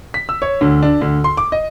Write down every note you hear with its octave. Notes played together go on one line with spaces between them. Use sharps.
B6
E6
C#5
D2
D4
D2
C6
D6
D#5